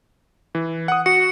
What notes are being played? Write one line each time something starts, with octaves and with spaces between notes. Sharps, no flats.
E3
F#5 D#6
F#4 C#7